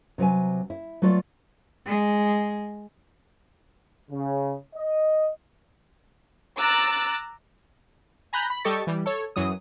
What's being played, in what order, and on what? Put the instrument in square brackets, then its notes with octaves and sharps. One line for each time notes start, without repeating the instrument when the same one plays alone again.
[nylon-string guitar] C3 F#3 B4 G#5
E4
F#3 A3 F4 B4 D5
[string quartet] G#3
[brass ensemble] C#3
D#5
[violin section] A#5 D6 E6 F#6 A6
[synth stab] G#5 A#5 B5 F#6 G6
B5
G3 G4 A4 D#5 C#6 A6
E3 G3
A4 C#5
F#2 E3 F#3 D#6